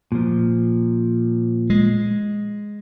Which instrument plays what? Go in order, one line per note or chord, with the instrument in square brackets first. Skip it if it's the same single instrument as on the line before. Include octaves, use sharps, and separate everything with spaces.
[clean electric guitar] A#2 F3
[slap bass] G#3